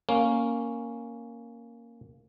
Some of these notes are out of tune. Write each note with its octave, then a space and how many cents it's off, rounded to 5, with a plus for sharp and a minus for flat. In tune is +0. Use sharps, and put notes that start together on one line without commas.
A#3 +0 C#4 +0